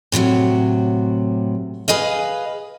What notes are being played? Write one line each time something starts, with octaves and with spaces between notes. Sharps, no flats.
A2 C3 E3 F#3
G#4 B4 D#5 F5